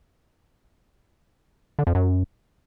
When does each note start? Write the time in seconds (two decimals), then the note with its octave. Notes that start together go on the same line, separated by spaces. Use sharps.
1.79 D3
1.87 F2
1.95 F#2